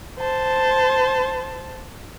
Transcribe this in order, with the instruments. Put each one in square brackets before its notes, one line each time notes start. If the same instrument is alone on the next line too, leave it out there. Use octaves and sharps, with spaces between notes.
[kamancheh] C5 A5